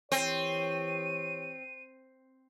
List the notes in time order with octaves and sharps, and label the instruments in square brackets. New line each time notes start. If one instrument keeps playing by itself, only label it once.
[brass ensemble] E3 G4 C#5 [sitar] C4 [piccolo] D#7